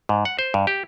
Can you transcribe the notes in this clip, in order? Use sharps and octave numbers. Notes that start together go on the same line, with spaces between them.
G#2
F#5
C5
G2
G4